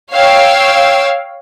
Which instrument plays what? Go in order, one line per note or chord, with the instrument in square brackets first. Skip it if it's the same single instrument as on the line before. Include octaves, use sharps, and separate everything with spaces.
[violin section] C#5 F5 G5 E6